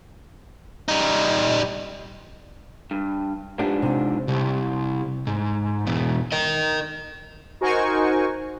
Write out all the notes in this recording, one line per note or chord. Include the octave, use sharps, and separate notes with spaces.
G3 D#4
G2
G#2 F3 B3 D4 G4 F#5
C3
C2
G#2
E2 B2
A#4 D#5
D#4 F#4 A#4 C5 G#5 C#6